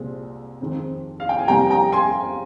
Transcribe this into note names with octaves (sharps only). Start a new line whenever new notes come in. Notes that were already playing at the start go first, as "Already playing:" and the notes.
Already playing: C2 A#2 G#3 C4
F2 D#3 G#3 C4
F5
G5
G#5
F2 C3 G3 A#3 G5 A#5
G5 A#5
G#5 C6